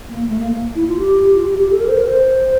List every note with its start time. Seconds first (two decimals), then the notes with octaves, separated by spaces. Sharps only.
0.09 A#3
0.28 A3
0.39 A#3
0.52 A#3
0.75 E4
0.88 F4
0.99 G4
1.35 F4
1.46 G4
1.59 G4
1.71 A4
1.80 A#4
1.89 C5
1.98 A#4
2.07 C5